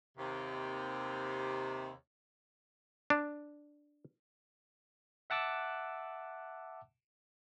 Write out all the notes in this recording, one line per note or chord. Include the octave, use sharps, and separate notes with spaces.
D#2 C3
D4
E5 F#5 A5 D6 E6 F#6